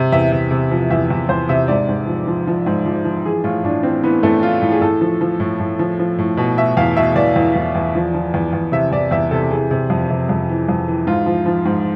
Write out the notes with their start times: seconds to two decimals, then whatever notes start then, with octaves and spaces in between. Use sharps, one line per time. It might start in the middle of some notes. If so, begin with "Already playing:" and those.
Already playing: C3
0.12 E2 E5
0.32 C3
0.51 C3
0.71 F3
0.91 E2 E5
1.10 E2
1.29 E2 C5
1.49 C3 E5
1.68 G#2 D5
1.89 G#2
2.07 F3
2.27 F3
2.47 F3
2.66 G#2
2.86 F3
3.05 F3
3.25 E3 G#4
3.44 A2 F4
3.64 A2 D4
3.83 E3 C4
4.03 E3 B3
4.23 A2 A3
4.43 E3 F4
4.62 A2
4.72 G#4
4.81 A2 A4
5.01 F3
5.21 F3
5.40 A2
5.60 A2
5.79 F3
5.99 F3
6.19 A2
6.37 B2
6.57 B2 E5
6.77 E2 F5
6.96 B2 E5
7.16 E2 D5
7.36 E2
7.56 E2
7.75 E2
7.95 F3
8.14 F3
8.34 E2
8.53 E2
8.72 C3 E5
8.92 E2 D5
9.11 E2 E5
9.31 C3 A4
9.51 E3 G#4
9.71 C3
9.90 F2
10.10 C3
10.29 F2
10.49 E3
10.69 F2
10.88 E3
11.07 G#2 F4
11.26 F3
11.46 F3
11.65 G#2